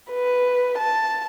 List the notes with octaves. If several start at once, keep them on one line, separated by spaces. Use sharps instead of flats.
B4
A5